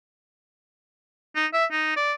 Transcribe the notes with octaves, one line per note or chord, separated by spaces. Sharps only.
D#4
E5
D#4
D5